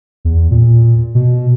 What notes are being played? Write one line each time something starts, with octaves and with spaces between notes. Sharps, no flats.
E2
A#2
B2